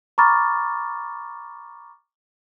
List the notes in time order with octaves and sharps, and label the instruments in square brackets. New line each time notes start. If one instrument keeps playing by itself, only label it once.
[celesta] A#5 B5 C#6 D6 F6 A6